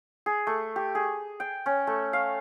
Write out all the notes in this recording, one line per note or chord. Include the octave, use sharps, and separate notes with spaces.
G#4
A3
G4
G#4
G5
C#4
A3
F5